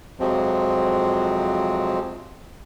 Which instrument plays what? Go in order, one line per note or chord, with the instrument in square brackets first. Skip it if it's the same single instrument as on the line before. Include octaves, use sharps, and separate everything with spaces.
[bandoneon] F2 C3 F3 F#3 G#3 C4